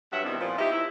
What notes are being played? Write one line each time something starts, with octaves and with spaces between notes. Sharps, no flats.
G2 F#3 E5 F#5
B2 D#3 G3 C4 E4
A#2 F3
D#4 E4 G4
E4